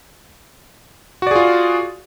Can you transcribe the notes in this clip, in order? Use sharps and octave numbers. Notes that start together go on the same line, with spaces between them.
F4 F#4 G#4 D5